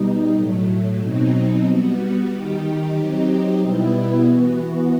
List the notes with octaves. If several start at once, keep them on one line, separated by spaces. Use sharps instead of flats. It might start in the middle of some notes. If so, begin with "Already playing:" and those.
Already playing: B2 G3 D#4
A2 F#3 A3
B2 F#3 C4 D#4
G3 B3 F#4
D#3 G3 D#4 G4
F#3 C4 D#4 G4
B2 G3 B3 E4
E3 B3 F#4